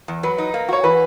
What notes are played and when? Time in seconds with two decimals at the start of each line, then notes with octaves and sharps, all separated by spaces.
0.08 E2
0.23 F#3 B4
0.38 D#4
0.54 A#3
0.69 F#4 C#5
0.84 E3 B4